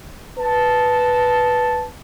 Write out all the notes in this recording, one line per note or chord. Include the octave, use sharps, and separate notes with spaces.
B4 A5